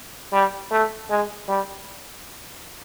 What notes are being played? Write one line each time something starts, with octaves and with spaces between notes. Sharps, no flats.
G3
A3
G#3
G3